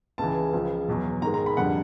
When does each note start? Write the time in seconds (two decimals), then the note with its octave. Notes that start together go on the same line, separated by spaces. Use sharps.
0.18 C#2 C#3 E3 A5
0.53 C#2 C#3 F3
0.88 E2 B2 F#3
1.22 G#2 D#3 G#3 A#5
1.34 A#5
1.46 B5
1.57 F2 D3 G3 F#5